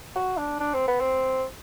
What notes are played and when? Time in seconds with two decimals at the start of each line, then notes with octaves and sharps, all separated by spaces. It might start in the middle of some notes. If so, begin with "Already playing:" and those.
0.15 F#4
0.37 D4
0.60 D4
0.74 C4
0.88 B3
1.00 C4